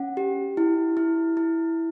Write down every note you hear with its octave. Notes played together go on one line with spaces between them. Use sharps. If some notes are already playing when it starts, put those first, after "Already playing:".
Already playing: C#4 F#5
G4
E4
E4
E4